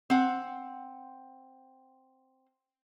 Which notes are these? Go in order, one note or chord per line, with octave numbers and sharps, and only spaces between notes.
C4 F#5